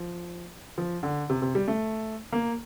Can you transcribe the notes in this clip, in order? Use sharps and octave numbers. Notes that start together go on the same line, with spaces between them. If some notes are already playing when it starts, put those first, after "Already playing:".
Already playing: F3
F3
D3
C3
C3
G3
A3
A#3